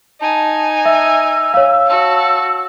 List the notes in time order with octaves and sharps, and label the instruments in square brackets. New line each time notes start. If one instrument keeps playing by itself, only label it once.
[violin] D#4 G#5 [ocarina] A5
[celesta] E5 [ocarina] E6
[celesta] C#5 F5
[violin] F#4 A5